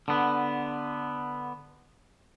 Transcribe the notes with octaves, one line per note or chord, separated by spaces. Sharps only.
D3 B3